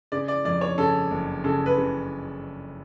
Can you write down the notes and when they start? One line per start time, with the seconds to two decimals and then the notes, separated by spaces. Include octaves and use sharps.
0.12 C#3 D5
0.28 D5
0.45 F2 D5
0.61 C#5
0.78 C#3 A4
1.11 F#1
1.44 C#3 A4
1.66 B4
1.77 C#3